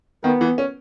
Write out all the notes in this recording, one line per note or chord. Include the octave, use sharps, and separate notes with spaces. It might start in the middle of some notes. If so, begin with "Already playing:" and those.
D#3 B3
E3
C#4